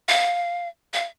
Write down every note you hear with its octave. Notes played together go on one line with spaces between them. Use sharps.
F5
F5